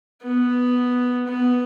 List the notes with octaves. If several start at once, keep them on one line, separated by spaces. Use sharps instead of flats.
B3
B3